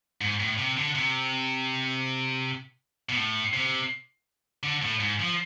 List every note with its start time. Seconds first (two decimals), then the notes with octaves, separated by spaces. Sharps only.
0.21 G#2
0.40 A2
0.58 C3
0.77 D3
0.95 C3
3.09 B2
3.16 A2
3.53 C3
4.63 D3
4.82 A2
5.00 G#2
5.19 F3